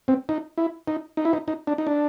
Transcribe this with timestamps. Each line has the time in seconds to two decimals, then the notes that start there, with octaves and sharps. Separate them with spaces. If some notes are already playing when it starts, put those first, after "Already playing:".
0.08 C4
0.29 D#4
0.58 E4
0.88 D#4
1.17 D#4
1.25 E4
1.33 D#4
1.48 D#4
1.67 D4
1.78 D#4
1.87 D4